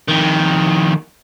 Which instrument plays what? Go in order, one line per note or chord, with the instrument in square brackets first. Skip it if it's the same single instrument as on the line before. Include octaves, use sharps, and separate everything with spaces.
[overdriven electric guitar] F2 D#3